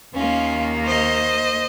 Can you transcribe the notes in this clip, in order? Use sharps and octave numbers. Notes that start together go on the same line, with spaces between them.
D#2 D#3 A#3 C#4 F4
C5 D#5